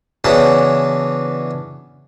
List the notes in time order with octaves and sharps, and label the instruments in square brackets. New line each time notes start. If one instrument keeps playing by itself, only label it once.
[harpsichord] C#3 E3 B3 D4 E4 F#4